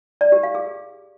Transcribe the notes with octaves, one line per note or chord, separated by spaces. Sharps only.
D5
G4
F5
G#4